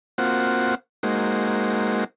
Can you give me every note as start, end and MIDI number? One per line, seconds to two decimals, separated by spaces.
0.18 0.75 58
0.18 0.75 60
0.18 0.75 65
0.18 0.75 66
0.18 0.75 72
0.18 0.75 78
1.03 2.04 56
1.03 2.04 58
1.03 2.04 63
1.03 2.04 66
1.03 2.04 72